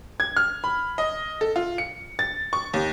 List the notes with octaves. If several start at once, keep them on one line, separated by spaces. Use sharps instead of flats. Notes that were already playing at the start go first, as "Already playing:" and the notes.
G#6
F6
B5
D#5
A4
F4
C#7
A6
C#6
D#2